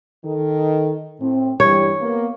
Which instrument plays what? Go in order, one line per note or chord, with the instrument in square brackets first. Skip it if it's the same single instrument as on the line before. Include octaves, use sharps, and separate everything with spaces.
[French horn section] D#3 A4
A2 C4
[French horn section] G2 E3 G3 [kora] C#5
[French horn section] A#3 B3